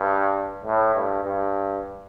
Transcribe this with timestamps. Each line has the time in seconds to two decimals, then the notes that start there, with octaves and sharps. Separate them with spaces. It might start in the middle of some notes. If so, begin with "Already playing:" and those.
Already playing: G2
0.64 A2
0.95 G2
1.24 G2